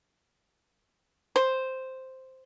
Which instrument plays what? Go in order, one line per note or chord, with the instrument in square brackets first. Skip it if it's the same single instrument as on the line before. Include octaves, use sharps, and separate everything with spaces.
[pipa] C5